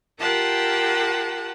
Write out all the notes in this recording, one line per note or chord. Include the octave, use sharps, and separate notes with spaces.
F4 G4 A#4 F#5 G5 A5